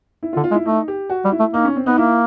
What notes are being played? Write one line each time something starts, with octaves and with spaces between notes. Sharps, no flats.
E4
F4
D3
F4
G#3
E4
A3 D#4
G4
F#4
G3
E4
A3
A#3 D#4
C#4
C4
B3 D#4
A#3 E4